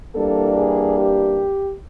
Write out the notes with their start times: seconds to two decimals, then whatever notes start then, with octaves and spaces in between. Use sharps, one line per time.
0.15 E3 G3 A#3 D4 A4
0.58 G#4
0.99 G4